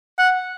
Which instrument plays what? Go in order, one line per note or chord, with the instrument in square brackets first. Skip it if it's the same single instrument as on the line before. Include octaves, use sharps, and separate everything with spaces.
[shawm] F#5